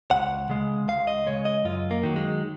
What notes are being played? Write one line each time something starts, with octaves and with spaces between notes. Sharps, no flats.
C#2 F#5
C#3 G#3
C#2 F5
D#5
C#3 G#3 C#5
D#5
F#2 F4
A#3
D#3 F#3
G#3